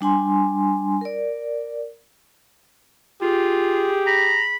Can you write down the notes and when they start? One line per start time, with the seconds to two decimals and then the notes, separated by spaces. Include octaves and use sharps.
0.01 G3 D4 G#5 C6
1.01 A#4 D5
3.22 F4 G4 G#4
4.06 A#5 B5